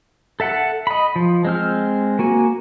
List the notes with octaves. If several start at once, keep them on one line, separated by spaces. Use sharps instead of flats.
A4 E5 F#5
D#5 B5
F3
G#3 C4 F6
A#3 F#4 G#5